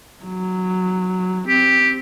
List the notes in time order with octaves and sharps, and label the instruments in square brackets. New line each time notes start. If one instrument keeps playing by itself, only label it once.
[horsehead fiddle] F#3
[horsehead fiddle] C4 [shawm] G4